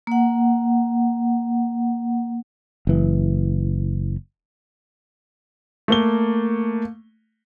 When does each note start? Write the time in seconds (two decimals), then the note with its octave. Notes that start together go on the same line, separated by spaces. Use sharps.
0.07 A#3 F#5
2.87 F#1 E3
5.88 A3 A#3 G7